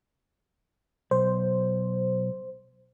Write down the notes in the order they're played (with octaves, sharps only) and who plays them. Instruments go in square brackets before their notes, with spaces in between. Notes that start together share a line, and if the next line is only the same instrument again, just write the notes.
[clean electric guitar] B1 [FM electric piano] C5